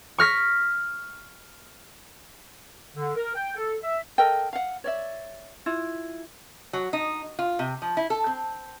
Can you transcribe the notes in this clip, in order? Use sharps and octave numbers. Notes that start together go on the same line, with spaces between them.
C#6 F6 A#6 B6
D3
A#4
G5
A4
E5
A4 A#4 D#5 G5
F5 F#5
C#5 D5 E5
E4 F4
F#3
D#4
F4
C3
F3
E4
A4
C4